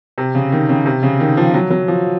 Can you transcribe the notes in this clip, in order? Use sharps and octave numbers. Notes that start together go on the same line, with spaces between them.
C3
C#3
D#3
C#3
C3
C#3
D#3
F3
F#3
F#3
F3